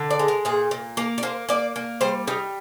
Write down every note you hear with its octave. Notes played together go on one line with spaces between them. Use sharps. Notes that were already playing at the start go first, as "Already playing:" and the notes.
Already playing: D3
D5
G#3
A#4
A#2 G#4
A#2
A#3 A#4
D5
A#3 C5
A#3 D5
A#3
G3 C5
G3 D#4